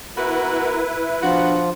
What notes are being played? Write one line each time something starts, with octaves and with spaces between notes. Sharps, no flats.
B3 E4 F#4 A#4 B4 A#5
E5
F3 B3 D4 F4 F#4 F#5